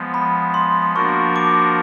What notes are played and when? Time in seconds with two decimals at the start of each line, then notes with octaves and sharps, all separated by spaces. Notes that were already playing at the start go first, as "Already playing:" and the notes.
Already playing: F3 G#3 B3
0.14 B5
0.54 C6
0.95 F3 A#3 D4 F#4 A#4 C#6
1.36 D6